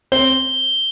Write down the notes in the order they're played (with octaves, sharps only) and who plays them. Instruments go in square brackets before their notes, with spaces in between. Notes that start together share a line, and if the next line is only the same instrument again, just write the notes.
[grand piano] C4 C5 [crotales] G7